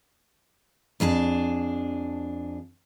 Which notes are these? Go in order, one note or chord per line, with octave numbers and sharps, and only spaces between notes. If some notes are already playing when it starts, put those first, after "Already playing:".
F2 D4 G#4 A5